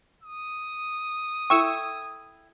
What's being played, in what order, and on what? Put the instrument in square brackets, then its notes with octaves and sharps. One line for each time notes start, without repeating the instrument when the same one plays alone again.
[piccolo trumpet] D#6
[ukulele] E4 A4 G5 [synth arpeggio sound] C#6 E6